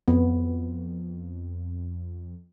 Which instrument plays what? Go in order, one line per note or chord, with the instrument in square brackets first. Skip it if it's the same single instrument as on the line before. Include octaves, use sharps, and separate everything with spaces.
[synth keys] F2 [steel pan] B3